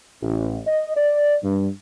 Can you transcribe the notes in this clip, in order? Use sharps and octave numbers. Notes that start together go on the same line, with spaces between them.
A1
D#5
D5
G2